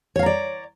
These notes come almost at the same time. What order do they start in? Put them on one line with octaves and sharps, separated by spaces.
C#5 F5 A#5 D5